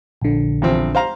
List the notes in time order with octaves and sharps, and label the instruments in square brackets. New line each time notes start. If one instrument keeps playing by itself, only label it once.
[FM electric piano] A#1 D3
[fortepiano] E2 F3 C4
C5 F5 A#5